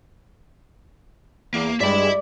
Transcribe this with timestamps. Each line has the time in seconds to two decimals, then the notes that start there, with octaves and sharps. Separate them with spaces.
1.54 E2 A#3
1.80 G2 G3 G#3 D5 E5 B5